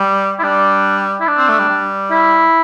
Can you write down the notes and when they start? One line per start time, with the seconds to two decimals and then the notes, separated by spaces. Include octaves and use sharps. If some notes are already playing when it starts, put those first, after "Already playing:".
Already playing: G3
0.39 E4
0.43 G3 D4
1.20 E4
1.27 D4
1.37 C4
1.48 A3
1.59 G3
1.69 G3
2.11 E4